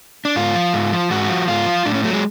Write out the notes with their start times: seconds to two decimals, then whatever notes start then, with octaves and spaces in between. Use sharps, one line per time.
0.25 D4
0.36 G#2 F4
0.55 F3
0.73 G#2
0.92 F3
1.10 G#2 F#4
1.29 F3
1.48 G#2 F4
1.66 F3
1.86 A2 D4
1.94 C#4
2.04 F#3 A3
2.13 G#3